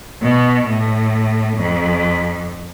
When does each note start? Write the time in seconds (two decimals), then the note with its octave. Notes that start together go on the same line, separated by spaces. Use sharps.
0.22 B2
0.68 A2
1.57 F2